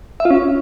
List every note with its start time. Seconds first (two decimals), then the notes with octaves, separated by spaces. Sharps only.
0.20 E5
0.25 F4
0.30 C#4